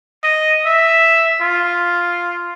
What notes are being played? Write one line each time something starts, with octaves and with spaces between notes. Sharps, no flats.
D#5
E5
F4